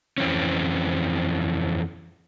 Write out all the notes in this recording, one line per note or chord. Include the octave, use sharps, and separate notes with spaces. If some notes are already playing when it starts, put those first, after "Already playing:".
F2 E3 C4 C#4